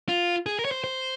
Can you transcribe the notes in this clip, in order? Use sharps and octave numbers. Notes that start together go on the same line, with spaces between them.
F4
G#4
A#4
C#5
C5
C5